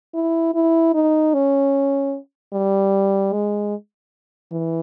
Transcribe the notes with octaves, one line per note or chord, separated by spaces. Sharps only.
E4
E4
D#4
C#4
G3
G#3
E3